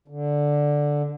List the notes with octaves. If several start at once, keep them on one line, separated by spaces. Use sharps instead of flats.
D3